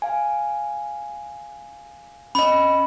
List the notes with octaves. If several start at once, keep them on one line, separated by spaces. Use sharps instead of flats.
F5 G#5
C#4 D#5 B5